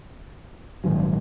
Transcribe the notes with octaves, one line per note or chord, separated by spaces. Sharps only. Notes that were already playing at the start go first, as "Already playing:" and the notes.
A#1 G#2 D#3 F#3